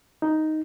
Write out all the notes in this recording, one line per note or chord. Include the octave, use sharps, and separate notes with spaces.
D#4